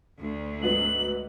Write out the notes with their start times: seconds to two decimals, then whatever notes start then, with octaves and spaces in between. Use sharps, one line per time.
0.21 D2
0.62 G#2 F#3 B3 F#7